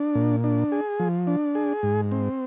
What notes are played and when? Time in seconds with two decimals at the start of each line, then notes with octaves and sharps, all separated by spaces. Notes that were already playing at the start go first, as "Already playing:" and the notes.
Already playing: D4
0.15 A#2
0.44 D4
0.72 G#4
1.00 F3
1.27 D4
1.55 G#4
1.83 G#2
2.12 C4